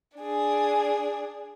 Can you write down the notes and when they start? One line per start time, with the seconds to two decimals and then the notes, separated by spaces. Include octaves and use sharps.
0.16 D4 G#4